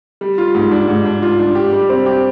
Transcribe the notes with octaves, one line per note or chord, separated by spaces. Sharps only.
G3
F4
G#2
D4
G#2
D4
F4
D4
G4
G3
C4
G4